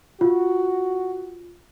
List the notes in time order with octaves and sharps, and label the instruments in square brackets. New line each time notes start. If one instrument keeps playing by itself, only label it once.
[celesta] F4 [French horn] F#4